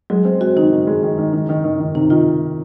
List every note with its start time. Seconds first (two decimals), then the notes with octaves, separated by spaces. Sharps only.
0.10 F#3 G#3
0.25 C4
0.41 C4 F#4
0.56 D#3 D#4
0.72 D#3
0.87 G#3
1.03 D#3
1.18 D#3
1.33 D#3
1.49 D#3
1.64 D#3
1.80 D#3
1.95 C3 D#4
2.10 D#3 F4